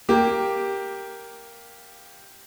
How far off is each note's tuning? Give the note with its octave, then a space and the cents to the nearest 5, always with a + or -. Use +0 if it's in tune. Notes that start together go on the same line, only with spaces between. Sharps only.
A#3 +0 G4 +0